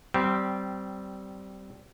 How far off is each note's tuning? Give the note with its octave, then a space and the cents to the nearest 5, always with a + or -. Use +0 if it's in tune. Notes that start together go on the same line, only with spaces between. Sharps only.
G3 -20 C4 -10